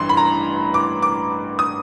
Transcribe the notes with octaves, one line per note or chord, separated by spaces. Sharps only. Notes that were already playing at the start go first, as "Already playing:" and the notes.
Already playing: A1 G2 E3 C6
B5
A#5
D6
D6
D#6